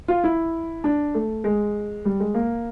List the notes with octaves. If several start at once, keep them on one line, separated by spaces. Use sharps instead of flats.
F4
E4
D4
A3
G#3
G3
G#3
A#3